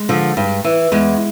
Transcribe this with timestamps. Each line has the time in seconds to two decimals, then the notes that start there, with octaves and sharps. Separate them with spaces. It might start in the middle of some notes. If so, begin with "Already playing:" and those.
Already playing: G#3
0.09 D3 F3
0.37 G2
0.64 E3
0.92 E2 G#3